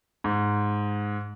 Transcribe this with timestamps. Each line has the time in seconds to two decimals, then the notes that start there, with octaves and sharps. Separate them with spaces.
0.24 G#2